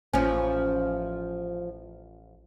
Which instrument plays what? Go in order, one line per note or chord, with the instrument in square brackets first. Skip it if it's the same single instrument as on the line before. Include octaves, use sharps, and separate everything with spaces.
[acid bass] A1 [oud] F3 C#4